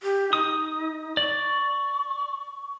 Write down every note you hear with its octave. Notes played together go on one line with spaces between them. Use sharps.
G4
D#4 D#6
D5 C#6